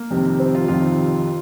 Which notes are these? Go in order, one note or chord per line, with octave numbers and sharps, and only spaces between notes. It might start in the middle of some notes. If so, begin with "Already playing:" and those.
Already playing: A#3
F2 C3 D#3
C4
F4
F2 C3 D#3 F4